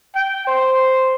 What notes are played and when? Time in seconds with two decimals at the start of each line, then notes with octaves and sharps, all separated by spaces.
0.15 G5
0.47 C5